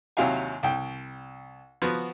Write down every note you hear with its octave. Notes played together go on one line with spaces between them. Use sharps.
D#2 C3 F#3 E4 F5 G#5
C2 G5
F3 B3 F#4